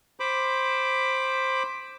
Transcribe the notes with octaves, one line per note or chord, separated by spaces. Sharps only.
C5 B5 D6